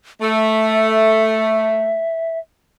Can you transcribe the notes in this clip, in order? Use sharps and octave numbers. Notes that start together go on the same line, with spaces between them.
A3 E5